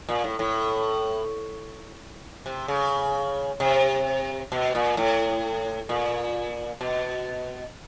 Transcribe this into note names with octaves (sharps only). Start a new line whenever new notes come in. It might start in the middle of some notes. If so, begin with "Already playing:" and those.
A#2
A2
A2
C3
C#3
C3
B2
A#2
A2
A#2
B2